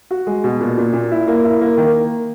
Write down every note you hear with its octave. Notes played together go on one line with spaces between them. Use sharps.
F#4
G#3
B2
A#2
A#2
A#2
E4
A#3
E4
A#3
D#3